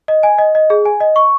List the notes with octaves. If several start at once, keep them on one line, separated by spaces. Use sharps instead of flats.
D#5
G#5
D#5
D#5
G#4
G#5
D#5
C#6